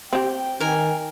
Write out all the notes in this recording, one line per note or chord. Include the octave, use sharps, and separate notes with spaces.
C4 G4 G5
D#3 A#4 G#5